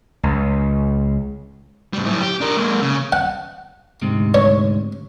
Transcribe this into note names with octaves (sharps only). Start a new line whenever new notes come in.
C#2
A2 G3
F#2 E4
G4
D4 A#4
G#3 A#3
C#3
F#5
D2 G#2 C3
C#5